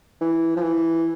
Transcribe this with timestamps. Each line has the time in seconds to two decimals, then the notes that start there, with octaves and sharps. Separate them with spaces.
0.21 E3
0.56 F3
0.63 E3